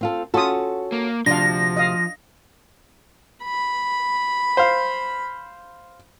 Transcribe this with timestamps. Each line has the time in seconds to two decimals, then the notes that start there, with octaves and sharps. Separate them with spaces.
0.01 C4 F4 A4
0.34 C#4 F4 F#4 A4 D#6
0.92 A#3
1.26 D2 C3 F3 D4 F5 A#6
1.77 D#5 F5
3.44 B5
4.57 C5 F5